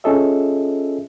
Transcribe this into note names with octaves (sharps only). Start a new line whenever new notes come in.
C#4 F4 G#4 A4 D#5 E5